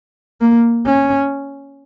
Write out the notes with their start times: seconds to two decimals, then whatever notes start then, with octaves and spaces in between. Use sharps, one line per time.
0.41 A#3
0.86 C#4